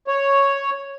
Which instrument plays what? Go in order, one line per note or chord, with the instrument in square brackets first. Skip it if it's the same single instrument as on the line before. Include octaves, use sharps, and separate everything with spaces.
[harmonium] C#5